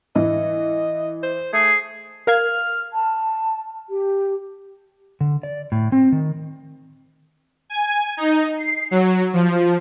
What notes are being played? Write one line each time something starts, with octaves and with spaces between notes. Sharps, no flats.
E3 D#5
C5
A3 G#4
A#4 F5 F6 G#6
A5
G4
D3
D5
A2
C4
D#3
G#5
D#4
C7
F#3
F3